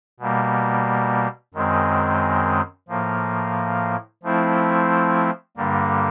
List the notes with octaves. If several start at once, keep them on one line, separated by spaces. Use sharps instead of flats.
B2 G3 A#3
F#2 D#3 G#3 C4
A2 F3 A#3
F3 A3 C4 E4
G2 D3 G3 A#3